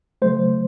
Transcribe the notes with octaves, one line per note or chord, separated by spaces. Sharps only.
C#3 F#3 A3 C5